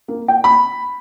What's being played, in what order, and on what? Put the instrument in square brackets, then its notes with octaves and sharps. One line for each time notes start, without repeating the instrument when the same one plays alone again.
[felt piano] A#3
G5
B5